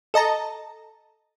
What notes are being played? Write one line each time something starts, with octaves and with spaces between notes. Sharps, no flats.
A4 D#5 A5 A#5